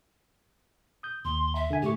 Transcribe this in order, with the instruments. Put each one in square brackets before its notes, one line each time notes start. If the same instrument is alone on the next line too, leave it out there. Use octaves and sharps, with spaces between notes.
[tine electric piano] D#6 G6
[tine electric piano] D#2 [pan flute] C6
[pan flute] E5
[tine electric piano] D3 G#5
[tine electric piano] A2 A3 C#6 [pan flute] G4